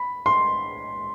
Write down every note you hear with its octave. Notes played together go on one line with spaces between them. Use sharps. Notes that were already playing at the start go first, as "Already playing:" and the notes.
Already playing: B5
C6